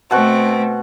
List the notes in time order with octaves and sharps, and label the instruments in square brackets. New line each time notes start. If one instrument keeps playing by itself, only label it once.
[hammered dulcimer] B2 F#5 C#6 [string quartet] A3 C4